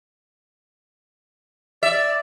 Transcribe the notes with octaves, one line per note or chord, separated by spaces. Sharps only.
D5 E5